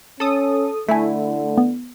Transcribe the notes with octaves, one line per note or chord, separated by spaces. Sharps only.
C#4 A4 D#6
D3 A3 E4 G#5 B6
B3